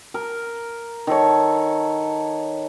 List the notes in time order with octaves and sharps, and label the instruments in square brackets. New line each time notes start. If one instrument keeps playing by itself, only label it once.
[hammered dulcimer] A#4
D#3 A4 C#5